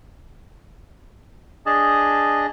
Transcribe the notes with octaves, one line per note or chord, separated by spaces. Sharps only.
D4 G#4 D#5 A5